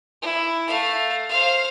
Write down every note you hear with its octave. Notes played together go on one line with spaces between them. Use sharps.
E4
A3 F5
C5 F5